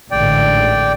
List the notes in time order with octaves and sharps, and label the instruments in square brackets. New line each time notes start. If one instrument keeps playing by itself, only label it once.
[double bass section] A1 G#2 D3 [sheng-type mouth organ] D5 G5